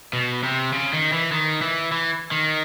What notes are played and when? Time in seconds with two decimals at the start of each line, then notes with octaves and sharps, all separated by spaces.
0.13 B2
0.43 C3
0.73 C#3
0.93 D#3
1.12 E3
1.32 D#3
1.62 E3
1.92 E3
2.31 D#3